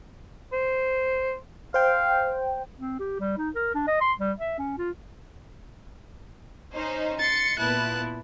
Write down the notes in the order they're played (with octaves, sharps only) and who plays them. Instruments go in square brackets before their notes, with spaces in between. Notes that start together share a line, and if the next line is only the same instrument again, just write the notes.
[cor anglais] C5
[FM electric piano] C5 G5 [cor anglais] F5
[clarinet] C4
G4
G3
D#4
A#4
D4
D#5
C6
G3
E5
C#4
F4
[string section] C#4 D#4 C5
[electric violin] C6 A6 [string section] C#7
[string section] A#2 B3 E4 [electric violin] A5 F#6